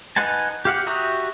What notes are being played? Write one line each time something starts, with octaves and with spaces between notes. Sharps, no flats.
D#4 B4 F#5 G#5 A5
G4 F5 F#5
F#4 G4 E5 A#5 D#6